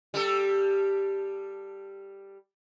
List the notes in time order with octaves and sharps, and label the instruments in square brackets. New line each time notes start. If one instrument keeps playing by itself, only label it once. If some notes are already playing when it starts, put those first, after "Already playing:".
[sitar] G3 G4 A4